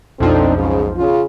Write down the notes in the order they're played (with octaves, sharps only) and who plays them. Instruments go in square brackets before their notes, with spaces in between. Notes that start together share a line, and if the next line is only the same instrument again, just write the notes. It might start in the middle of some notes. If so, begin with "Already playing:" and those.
[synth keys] B1 F2 F3 [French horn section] C4 D4 D#4 [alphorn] A4
[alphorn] G#2 [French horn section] C#3
[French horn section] C#3 [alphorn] F4